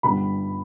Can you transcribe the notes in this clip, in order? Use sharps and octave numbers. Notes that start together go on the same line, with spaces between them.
G1 G2 D3 G3 B5